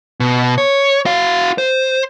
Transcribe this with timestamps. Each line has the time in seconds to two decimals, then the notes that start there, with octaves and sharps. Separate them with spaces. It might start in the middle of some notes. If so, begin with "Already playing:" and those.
0.20 B2
0.58 C#5
1.06 F#4 F5
1.58 C5